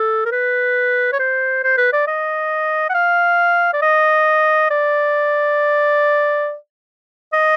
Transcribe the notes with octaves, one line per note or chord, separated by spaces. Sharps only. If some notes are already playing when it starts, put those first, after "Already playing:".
Already playing: A4
A#4
B4
C#5
C5
C5
B4
D5
D#5
F#5
F5
D5
D#5
D5
D#5